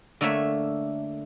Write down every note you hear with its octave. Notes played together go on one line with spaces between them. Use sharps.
D3 A3 A#3 C#5 E5